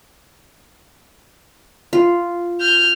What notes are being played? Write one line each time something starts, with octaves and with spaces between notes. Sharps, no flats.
F4
F6 G6